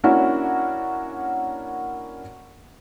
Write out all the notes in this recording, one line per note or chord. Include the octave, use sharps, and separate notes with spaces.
A#3 C#4 D4 E4 F#4